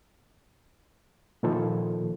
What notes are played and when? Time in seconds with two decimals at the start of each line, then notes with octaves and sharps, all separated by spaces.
1.43 A#2 D#3 F3 A4